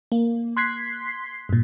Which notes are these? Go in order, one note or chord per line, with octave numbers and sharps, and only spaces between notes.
A#3
C6 F#6 G#6 B6 C7
G2 A#2